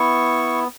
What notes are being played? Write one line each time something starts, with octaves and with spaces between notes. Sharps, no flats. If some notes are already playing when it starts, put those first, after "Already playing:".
Already playing: B3 E4 C#6